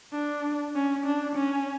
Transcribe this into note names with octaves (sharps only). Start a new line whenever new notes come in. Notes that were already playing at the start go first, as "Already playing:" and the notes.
D4
C#4
D4
C#4